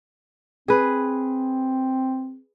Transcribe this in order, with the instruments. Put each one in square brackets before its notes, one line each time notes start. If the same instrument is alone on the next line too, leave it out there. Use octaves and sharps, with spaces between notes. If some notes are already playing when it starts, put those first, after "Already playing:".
[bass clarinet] C4 [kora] G#4 B4